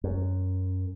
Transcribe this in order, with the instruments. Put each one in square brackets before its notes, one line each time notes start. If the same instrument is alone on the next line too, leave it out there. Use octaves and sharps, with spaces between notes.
[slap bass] F#2